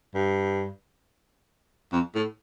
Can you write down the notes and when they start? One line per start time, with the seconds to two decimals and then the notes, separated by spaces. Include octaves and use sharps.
0.14 G2
1.92 F2
2.15 A2